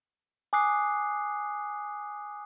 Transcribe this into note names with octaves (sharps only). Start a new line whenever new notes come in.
G#5 D6 D#6 F#6 C7